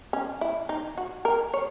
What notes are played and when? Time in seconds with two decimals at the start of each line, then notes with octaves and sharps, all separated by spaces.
0.13 C#4
0.41 E4
0.69 D#4
0.97 F#4
1.25 A#4
1.54 C#5